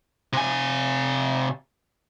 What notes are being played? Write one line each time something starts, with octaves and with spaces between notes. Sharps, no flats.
C3 G#5